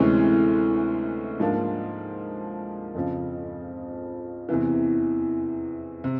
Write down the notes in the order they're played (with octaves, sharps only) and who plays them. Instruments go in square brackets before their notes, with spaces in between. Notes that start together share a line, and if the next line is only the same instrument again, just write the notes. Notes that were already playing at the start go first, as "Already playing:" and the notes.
Already playing: [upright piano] D2 C3 E3 G#3 C#4
G#2 F3 A#3 D4
F2 C#3 F3
E2 C3 E3
C3